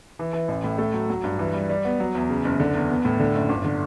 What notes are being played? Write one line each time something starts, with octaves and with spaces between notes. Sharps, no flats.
E3
E3
A1
A2
A3
F#3
F#3
G2
E3
G3
G3
B3
F#3
E2
C#3
F#1
D3
E2
B3
A2
D3
F#1
G1
D3